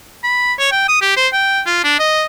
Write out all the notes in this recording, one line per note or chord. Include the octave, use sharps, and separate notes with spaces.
B5
C#5
G5
D#6
G4
C5
G5
F4
D4
D#5